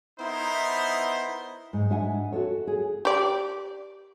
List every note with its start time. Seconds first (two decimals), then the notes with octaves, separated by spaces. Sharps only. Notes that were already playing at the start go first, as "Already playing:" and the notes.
0.19 B3 D#4 E4 A#4 C5
1.73 G#2
1.90 G#2 D4 E5 F#5 G#5
2.32 F#4 G4 A4 C#5
2.67 G#4
3.05 G4 D5